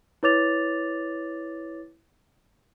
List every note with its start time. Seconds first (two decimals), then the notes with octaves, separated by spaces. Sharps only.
0.23 E4 B4 C#5 D6 A6 F7